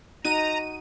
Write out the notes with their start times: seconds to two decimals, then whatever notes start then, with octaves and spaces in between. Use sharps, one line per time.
0.25 D#4 F#4 D#5 A#5 D#7